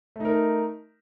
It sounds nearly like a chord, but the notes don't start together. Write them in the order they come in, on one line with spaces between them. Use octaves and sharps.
A3 D#4 A#4